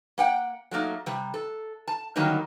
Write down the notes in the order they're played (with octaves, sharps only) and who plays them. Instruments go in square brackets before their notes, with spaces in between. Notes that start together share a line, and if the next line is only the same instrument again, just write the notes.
[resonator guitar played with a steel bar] A#3 F#5 G5
F#3 A3 A#3 D#4
C3 G3
A4
A5
D3 D#3 F#3 G3 A#3 D#4